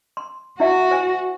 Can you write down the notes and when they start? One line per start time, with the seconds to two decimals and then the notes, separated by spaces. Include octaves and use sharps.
0.17 C6
0.60 E4 F#4 E5
0.91 C5 G#5